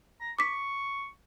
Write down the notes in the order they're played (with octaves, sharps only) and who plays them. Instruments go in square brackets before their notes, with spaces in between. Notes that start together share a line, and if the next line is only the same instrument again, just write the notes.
[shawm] A#5
[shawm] C#6 [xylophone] D6 B6